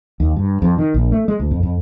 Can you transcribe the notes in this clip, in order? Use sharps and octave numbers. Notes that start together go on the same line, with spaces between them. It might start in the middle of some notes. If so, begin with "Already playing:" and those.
D#2
G2
F2
D#3
A#1
A3
G#3
D2
F2
F2